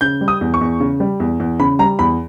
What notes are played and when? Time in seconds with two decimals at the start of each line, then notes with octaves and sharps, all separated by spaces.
0.01 C#3 G6
0.21 G3
0.28 D#6
0.41 E2
0.54 C#6
0.61 E2
0.80 C#3
1.00 G3
1.20 E2
1.40 E2
1.59 C#3 B5
1.79 G3 A#5
1.99 E2 B5